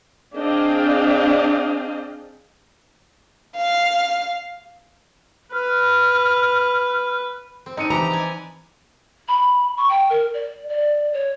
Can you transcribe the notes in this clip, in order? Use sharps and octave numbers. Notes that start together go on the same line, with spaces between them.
C4 D4 G#4 D#5 F5 G5
F5
B4 F6
C4
C4 D4 D#4 C#7 D#7
E3 F3 G4 A#5
G4 D5 G#5
B5
C#6
G5
A#4
D5
D5
C#5